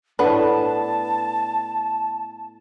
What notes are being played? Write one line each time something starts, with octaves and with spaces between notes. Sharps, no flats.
A2 B3 D4 A4 B4 F#5 A5